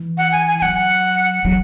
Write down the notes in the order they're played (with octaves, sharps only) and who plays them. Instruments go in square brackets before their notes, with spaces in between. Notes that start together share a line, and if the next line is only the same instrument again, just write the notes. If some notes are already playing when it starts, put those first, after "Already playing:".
Already playing: [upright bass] E3
[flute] F#5
G#5
G#5
G#5
[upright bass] F#3 [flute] F#5
[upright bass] F#3